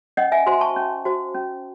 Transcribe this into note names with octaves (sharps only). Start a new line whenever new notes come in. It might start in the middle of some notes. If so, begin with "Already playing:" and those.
C#4 D#5 F#5
E5 G#5
F#4 C5 G#5 C6
A5 C#6
C#4
F#4 C5
C#4